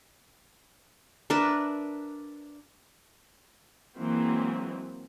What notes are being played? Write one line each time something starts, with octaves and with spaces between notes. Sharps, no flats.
D4 A#4 B4 E5
E3 F#3 G#3 A#3 C4